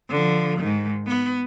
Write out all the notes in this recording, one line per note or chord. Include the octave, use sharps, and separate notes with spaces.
D3 F3
G#2 D#3
B3